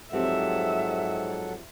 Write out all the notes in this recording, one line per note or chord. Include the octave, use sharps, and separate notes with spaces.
G#2 F3 F#3 C4 G4 A4 E5 F#5